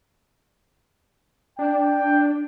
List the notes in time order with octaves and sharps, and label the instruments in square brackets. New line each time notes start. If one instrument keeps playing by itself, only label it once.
[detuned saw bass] D4 [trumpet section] G5